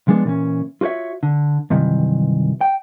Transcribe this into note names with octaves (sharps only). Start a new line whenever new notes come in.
F3 G#3 B3 D4
A#2 E3 C#4
F4 F#4 B4 C#5 E5
D3
G2 C3 D#3 E3 F#3
G5